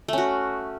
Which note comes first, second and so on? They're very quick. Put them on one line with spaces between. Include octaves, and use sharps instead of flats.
A3 C#4 F#4